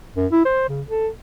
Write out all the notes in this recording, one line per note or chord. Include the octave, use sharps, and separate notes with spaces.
F#2
E4
C5
C#3
A4